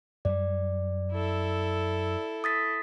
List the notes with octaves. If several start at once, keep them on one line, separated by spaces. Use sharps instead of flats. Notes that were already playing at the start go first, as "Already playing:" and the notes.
F#2 G3 D5
E4 A4
D#6 A6 B6